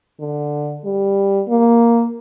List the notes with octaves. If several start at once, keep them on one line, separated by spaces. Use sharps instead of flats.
D3
G3
A#3